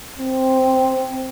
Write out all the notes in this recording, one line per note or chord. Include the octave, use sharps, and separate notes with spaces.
C4